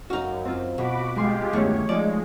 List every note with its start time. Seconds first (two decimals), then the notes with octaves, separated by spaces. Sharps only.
0.10 F#2 D#4 F#4 F5
0.45 C4 F4
0.78 B2 F#4 B5 D6
1.16 G3 G#3 F4 G4 G#4 C6
1.53 E2 G2 D#3 A3 C#4 C#5
1.89 F3 G#3 D#4 D5